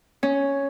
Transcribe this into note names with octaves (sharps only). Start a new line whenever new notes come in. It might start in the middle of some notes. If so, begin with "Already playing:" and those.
C#4